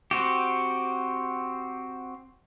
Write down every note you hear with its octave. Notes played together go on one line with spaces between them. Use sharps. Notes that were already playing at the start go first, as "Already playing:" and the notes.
C4 F#4 G4